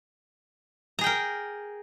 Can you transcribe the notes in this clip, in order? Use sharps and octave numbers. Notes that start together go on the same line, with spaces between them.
G#4 A#4 G5 A#5